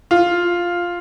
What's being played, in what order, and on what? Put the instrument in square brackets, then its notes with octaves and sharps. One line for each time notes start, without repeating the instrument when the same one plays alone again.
[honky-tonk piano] F4